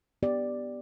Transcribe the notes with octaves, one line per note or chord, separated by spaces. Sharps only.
B3 G4 D5